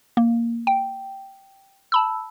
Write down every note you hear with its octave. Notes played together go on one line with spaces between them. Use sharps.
A#3
G5
A5 B5 E6